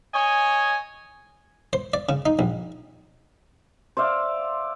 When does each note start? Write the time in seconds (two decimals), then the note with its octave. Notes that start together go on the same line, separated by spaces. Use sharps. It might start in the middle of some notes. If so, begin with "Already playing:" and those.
0.14 C#5 D#5 G#5
1.73 C5
1.94 D5
2.09 C#3
2.26 D#4
2.39 A#1
3.97 C5 D5 E5 F5